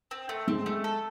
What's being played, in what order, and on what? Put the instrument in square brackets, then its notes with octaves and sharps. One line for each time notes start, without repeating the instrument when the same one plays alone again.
[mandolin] C4
A3
[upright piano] G#3 [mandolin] C4
[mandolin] A3
A4